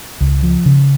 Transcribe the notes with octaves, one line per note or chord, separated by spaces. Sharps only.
C#2
F3
C#3